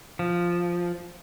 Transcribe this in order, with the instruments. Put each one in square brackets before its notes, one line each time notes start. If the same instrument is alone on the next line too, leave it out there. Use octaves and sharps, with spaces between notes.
[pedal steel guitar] F3